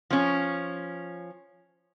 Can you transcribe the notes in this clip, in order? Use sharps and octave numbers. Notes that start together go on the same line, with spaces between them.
F3 C#4